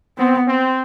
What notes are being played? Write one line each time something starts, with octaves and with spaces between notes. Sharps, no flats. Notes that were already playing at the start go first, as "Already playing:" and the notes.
B3 C4
C4